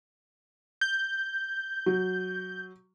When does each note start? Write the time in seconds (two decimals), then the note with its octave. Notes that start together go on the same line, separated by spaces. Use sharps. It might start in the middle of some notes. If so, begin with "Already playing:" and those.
0.81 G6
1.86 F#3